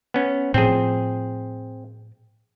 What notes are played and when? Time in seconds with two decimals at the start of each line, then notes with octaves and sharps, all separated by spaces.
0.14 B3 C#4
0.54 A2 F3 C4 G#4